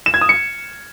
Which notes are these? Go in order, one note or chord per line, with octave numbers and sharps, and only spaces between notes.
E7
G#6
D#6
C#7